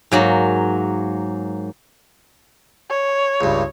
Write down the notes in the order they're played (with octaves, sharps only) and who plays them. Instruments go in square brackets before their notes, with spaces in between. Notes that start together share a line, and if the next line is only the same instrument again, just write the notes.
[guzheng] G#2 F#3 A#3
[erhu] C#5
[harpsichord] C#2 G2